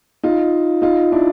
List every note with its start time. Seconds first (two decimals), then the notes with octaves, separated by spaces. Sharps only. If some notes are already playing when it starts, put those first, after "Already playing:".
0.24 D#4 F4
0.82 D#4 F4
1.12 D4 E4